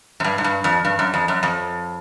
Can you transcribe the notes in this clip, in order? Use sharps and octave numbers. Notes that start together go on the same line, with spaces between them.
F#2
G2
G#2
G2
F2
G2
F#2
F2
F#2
F2